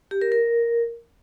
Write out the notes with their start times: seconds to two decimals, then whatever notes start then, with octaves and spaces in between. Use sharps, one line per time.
0.11 G4
0.22 A#4
0.32 A#4